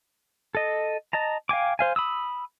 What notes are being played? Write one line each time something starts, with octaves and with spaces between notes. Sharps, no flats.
A4 D#5
D#5 A5 A#5
F5 G5 G#5 D6
C5 F5 G#5
B5 D#6 E6